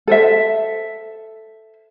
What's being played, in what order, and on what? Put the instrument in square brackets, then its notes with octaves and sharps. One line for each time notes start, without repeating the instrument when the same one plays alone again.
[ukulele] A4 C5 E5